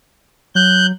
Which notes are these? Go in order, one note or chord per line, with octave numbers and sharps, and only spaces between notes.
F#3 F#6 G6